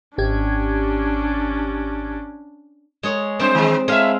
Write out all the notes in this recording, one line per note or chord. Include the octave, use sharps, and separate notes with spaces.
G#1 C#4 D4 G4 G#6
G#3 G#4 C#5
G3 C4 D4 C5
D#3 G#3
A2 G#3 E5 F5